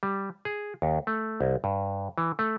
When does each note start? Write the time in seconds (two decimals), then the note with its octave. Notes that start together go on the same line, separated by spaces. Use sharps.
0.03 G3
0.45 G#4
0.82 D#2
1.07 A3
1.41 C2
1.64 G2
2.18 E3
2.39 A3